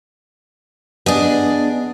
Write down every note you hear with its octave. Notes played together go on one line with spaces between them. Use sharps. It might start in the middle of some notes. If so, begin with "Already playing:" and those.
B3 D4 G#4 D#5 D#6